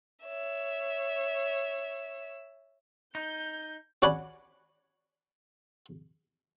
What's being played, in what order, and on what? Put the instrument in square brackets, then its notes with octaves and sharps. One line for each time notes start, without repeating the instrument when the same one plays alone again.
[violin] C#5 E5
[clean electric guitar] D#4 [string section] G6
[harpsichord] C#4 F#4 D5 F#5 G#5 B5